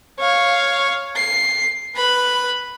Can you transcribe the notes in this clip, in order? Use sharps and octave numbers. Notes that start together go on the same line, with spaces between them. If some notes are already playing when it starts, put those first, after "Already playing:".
C#5 F5
C7
B4 B5